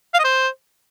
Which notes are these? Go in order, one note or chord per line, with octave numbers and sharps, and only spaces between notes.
F5
D#5
C5